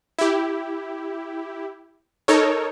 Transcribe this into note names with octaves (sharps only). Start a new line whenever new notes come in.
E4 G4
D#4 A4 A#4 C#5